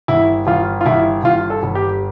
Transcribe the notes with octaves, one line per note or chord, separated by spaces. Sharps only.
G1 E4
G1 F4
F4
G1 E4
G1 F4
A4
G1
G4